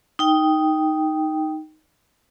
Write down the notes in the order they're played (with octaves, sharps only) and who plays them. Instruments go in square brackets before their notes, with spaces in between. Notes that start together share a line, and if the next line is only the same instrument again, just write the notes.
[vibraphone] D#4 G5